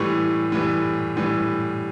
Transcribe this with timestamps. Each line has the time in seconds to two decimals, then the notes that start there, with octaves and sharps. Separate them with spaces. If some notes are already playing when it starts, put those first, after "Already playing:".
Already playing: A2 E3 G3 C#6
0.52 A2 E3 G3
1.17 A2 E3 G3